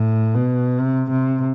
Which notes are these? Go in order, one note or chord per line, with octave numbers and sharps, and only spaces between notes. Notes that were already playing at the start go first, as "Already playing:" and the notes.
Already playing: A2
B2
C3
C3